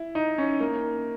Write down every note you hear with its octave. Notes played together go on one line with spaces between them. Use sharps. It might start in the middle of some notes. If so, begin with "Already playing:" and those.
Already playing: E4
D#4
C#4
A#3